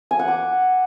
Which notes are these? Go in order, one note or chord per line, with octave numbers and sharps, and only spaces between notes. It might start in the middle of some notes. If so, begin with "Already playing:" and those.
G#5
F#5
D6